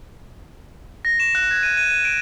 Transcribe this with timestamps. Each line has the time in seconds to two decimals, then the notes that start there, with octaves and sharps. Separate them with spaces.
1.05 A#6
1.20 E7
1.35 F#6
1.51 G#6
1.63 D#7
1.77 D#7
1.91 D#7
2.05 D7